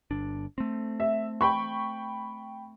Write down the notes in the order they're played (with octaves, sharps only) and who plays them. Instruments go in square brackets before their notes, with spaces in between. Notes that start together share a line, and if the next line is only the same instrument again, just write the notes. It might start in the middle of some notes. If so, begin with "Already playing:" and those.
[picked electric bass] G1 D4
A3 C4
[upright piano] E5
G5 B5 C#6